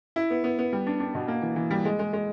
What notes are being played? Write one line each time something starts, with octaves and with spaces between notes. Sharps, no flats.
E4
B3
B3
B3
G3
D4
D4
B2
A#3
E3
E3
G3
G#3
G#3
G#3